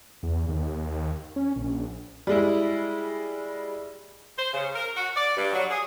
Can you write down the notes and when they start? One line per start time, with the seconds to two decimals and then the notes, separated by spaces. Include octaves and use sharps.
0.23 E2
0.49 D#2
1.36 C#4
1.56 A#1
2.27 G3 G#3 E4
4.37 C5
4.53 C#3
4.75 A#4
4.95 F#4
5.16 D5
5.36 G2
5.53 F#3
5.69 G#4